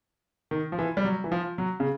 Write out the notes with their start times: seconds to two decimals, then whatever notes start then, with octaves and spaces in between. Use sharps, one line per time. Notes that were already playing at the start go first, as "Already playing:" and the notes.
0.51 D#3
0.72 F3
0.79 E3
0.97 G3
1.04 F#3
1.24 E3
1.32 F3
1.58 F#3
1.80 C#3